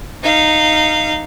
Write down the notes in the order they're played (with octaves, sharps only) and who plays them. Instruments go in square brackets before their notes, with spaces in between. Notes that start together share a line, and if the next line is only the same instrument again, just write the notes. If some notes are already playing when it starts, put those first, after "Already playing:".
[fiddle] D#4 F5